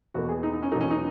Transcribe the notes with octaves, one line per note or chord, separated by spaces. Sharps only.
E2 B2 A#3 F#4
G#4
D#4
D#4
C#4
E2 B2 F#3 A#3 D#4
C#4
D#4